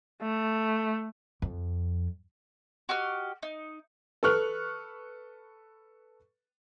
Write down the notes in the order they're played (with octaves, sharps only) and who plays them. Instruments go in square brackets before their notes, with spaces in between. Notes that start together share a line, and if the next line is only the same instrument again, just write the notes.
[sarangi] A3
[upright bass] F2
[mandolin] F#4 G4 D#5 F6
D#4
[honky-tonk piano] A4 B4 C#6 F6 F#6